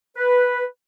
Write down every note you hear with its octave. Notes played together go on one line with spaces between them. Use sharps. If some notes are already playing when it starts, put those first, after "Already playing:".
B4